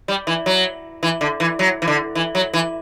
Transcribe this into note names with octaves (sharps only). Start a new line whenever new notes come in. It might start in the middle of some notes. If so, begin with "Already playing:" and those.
G3
E3
F#3
E3
D3
E3
F#3
E3
D3
E3
F#3
E3